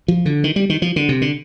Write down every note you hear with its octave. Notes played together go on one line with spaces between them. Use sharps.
F3
D3
D#3
G3
D#3
F3
D3
C3
D3